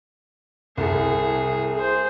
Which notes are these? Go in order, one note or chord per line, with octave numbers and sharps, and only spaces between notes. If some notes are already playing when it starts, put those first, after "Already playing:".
C2 G#4 A4
G#4 C5